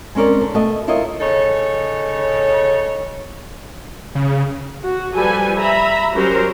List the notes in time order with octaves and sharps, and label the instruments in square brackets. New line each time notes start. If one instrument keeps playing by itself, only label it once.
[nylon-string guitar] G#3 C4 C#4 A#4 D5
D3
B2 A3 D#5
E4 F4 A#4 C#5 D#5
[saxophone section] C#3 D#4 A4 C#5
[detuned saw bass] C#3
[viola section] F#4
F3 G3 A4 B4 G#5
E5 A#5 B5
F#3 G3 C#4 G4 A#4 C5